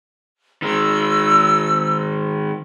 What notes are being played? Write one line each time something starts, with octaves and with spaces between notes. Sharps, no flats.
D#3 G#3 E6